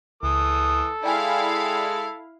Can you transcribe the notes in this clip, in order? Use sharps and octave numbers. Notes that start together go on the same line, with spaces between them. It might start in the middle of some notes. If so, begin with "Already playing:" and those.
C#2 E3 A4 D#6
G#3 E4 D5 F5 G5 G#5